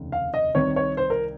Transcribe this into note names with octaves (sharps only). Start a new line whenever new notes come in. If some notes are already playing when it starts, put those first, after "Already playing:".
Already playing: F1 D#2 C#3
F5
D#5
C2 C3 D#3 C#5
C#5
C5
A#4